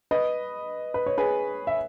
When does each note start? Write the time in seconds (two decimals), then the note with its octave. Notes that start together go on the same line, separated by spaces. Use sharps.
0.11 B4 D#5
0.94 B4
1.06 C#5
1.18 G#4 B4
1.67 E5